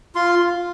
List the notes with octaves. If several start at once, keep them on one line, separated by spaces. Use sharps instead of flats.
F4 C6
F4